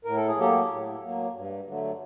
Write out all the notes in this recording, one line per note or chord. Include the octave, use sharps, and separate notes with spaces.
A2 A#4
A4
G#4
F#3 A#3 G4 A4
A2
F#3 A#3
G2
D3 F#3 A3